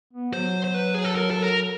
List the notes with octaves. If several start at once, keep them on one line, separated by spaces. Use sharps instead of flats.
B3
F#3 C5
C5
B4
G#4
A4
A#4
A4
A#4